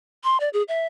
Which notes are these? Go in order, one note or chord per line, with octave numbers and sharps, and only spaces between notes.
C6
D5
G#4
E5